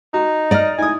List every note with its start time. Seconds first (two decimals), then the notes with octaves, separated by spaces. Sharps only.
0.14 D#4 F#4
0.51 D5 D#5 A#5 F6
0.79 D#4 E4 G#5 D#6